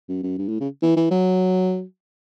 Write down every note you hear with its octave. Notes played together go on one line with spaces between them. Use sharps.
F#2
F#2
G2
A2
C#3
E3
E3
F#3